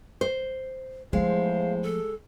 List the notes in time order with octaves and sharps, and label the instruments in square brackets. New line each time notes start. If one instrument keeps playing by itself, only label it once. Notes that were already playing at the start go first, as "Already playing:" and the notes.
[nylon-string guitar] C5
[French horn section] E2 A2 C5 [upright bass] F3 A3 [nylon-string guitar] G#3 [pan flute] F5
[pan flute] A4